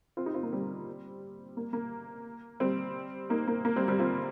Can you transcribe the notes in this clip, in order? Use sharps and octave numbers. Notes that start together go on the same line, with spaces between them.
C4 F4
D#4 G4
C4 F4
A#3 D#4
G3 C4
A#3
A#3
G3 C4
A#3 D#4
A#3
A#3
G3 C4
G3 C4
C4 F4